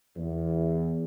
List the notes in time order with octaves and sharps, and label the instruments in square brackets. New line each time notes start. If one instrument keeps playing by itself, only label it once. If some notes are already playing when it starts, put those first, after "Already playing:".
[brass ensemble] E2